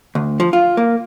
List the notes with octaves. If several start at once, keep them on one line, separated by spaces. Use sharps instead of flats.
D2
F3
F4
A#3